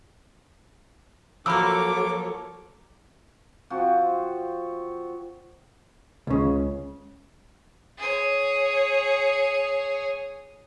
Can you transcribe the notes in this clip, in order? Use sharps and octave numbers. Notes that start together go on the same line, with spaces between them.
F3 F#3 A#3 A4 C#5 B5 D6 E6
F3 C4 F#4
C#2 C#3
G#4 C#5